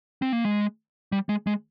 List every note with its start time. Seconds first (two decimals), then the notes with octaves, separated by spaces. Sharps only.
0.22 C4
0.33 A#3
0.44 G#3
1.12 G3
1.29 G#3
1.47 G#3